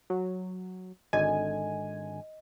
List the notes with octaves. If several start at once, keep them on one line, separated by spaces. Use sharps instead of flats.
F#3
G#1 D3 D#5 G#5